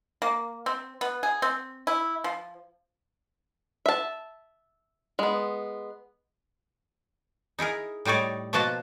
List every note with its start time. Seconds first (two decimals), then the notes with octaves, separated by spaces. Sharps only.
0.22 A#3
0.66 C4
1.01 B3
1.23 G#4
1.42 C4
1.87 E4
2.24 F3
3.86 E5 A5
5.19 G#3 B3
7.59 D#4 E4 G#4 A#4
8.05 A2 G3 D#4 C#5 D5
8.53 B2 F3 A#3 F4 F#4 A5